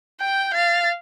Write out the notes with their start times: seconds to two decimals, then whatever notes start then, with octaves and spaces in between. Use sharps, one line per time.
0.20 G5 G6
0.47 G6
0.54 F5 A6
0.84 A6